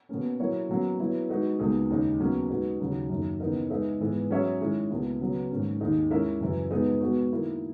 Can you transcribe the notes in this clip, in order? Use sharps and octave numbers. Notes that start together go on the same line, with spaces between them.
B2 A#3 C#4
F#3 A#3 E4 A#4 C#5
B2 F#3 A#3 C#4
F#3 B3 E4
G#3 D#4 F#4 B4
C#2 B2 A#3 D#4 G#4
D#2 C#3 G#3 D#4
B2 F#3 A#3 C#4 G#4
B2 G#3 B3 D#4 F#4
D#2 C#3 F#3
F#2 D#3 A#3
C#3 E3 B3 D#4 A#4
G#3 D#4 G#4 B4 E5
G#2 E3 G#3 B3
F#3 C#4 G#4 C#5 E5
D#3 G#3 C#4 E4
C#2 B2 A#3 E4
C#3 F#3 B3
G#2 D#3 A#3 C#4
D#2 D#3 A#3 D#4 G#4
G#3 C#4 E4 A#4 E5
F#2 C#3 E3
B2 G#3 B3 D#4 G#4
B2 G#3 B3 F#4
D#3 A#3 E4 A#4